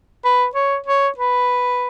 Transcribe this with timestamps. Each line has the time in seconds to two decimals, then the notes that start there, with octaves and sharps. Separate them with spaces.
0.25 B4
0.55 C#5
0.87 C#5
1.18 B4